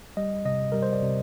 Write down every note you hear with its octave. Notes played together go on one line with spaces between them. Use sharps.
G3 D#5
C3 D#5
G3 A#4
C5
D5
C3